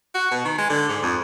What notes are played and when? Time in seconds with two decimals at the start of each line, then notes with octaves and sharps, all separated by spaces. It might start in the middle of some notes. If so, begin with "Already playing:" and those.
0.15 F#4
0.31 B2
0.45 D#3
0.58 G#3
0.70 D3
0.89 G#2
1.03 F2